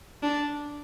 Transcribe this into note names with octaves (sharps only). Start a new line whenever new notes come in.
D4